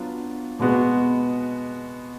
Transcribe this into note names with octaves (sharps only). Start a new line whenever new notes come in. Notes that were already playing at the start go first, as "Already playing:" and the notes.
Already playing: F#3 B3 D4 F4
B2 G#3 B3 F#4